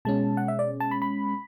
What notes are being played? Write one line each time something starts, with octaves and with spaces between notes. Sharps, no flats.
B2 G#3 C#4 A5
F#5
E5
D5
A5
B5
B5